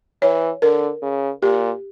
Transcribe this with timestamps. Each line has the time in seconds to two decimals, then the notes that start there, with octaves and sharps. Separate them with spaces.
0.22 E3 C#5
0.62 D3 A#4
1.02 C#3
1.42 A#2 G4